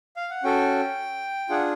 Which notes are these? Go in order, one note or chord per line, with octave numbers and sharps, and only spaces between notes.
F5
F#5
C#4 F#4 A4 G5
D4 F4 G#4 F#5